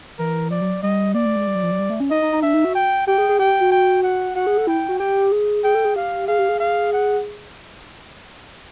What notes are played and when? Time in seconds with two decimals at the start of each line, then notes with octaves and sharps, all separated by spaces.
0.19 E3 A#4
0.50 F3 D5
0.61 F#3
0.83 G3 D#5
1.14 A#3 D5
1.25 A3
1.36 G#3
1.47 G3
1.55 F#3
1.63 F3
1.71 F#3
1.79 G3
1.90 A3
2.00 C#4
2.11 D#4 D#5
2.22 D#4
2.32 D#4
2.43 D4 E5
2.54 D#4
2.65 F#4
2.75 G5
3.07 G4 G5
3.18 G#4
3.29 G#4
3.39 G4 G5
3.61 F#4
3.72 G5
4.03 F#5
4.35 F#4 F#5
4.47 G#4
4.57 A4
4.67 E4 G5
4.89 F#4
4.99 G4 G5
5.32 G#4
5.64 G#4 G5
5.75 A4
5.85 G#4
5.96 G4 F5
6.28 G#4 F5
6.39 G4
6.49 G#4
6.60 F5
6.93 F#5